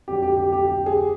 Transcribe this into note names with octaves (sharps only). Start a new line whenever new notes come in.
F2 D3 F#3 G4
G4
G4
G4
G4
G#4